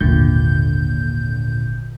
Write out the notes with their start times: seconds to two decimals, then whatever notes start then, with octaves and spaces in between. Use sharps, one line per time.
0.01 G#1 D#2 A#2 D3 G6